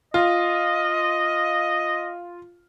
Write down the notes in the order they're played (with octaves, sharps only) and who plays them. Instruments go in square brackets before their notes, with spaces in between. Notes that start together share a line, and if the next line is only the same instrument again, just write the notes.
[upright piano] F4 [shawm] D#5